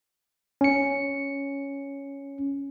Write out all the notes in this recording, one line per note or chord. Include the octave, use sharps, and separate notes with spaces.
C#4 C#7